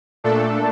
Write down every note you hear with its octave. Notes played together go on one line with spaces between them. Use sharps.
A#2 A3 D4 A4